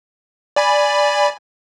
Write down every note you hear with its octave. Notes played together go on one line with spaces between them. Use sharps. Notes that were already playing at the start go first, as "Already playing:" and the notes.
D5 G#5 B5